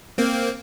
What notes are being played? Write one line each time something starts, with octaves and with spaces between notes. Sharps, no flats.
A#3 C4